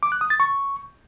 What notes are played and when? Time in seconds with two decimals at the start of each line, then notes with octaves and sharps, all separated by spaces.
0.03 D6
0.12 F#6
0.21 D#6
0.30 A6
0.40 C#6